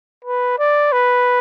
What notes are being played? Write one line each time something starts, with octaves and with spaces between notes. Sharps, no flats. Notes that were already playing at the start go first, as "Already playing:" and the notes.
B4
D5
B4